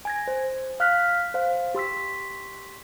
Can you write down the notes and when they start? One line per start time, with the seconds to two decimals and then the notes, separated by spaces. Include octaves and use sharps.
0.05 G#5 G#6 A#6
0.28 C5
0.80 F5 F6 F#6 B6
1.34 C5 F5
1.75 G4 C6 E6 B6